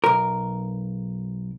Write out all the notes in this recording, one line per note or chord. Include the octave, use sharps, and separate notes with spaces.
B1 A#4